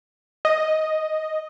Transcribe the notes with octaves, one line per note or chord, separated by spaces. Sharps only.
D#5